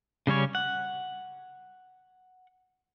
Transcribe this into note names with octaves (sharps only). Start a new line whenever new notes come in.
C#3 G3 C#4 C#5
F#5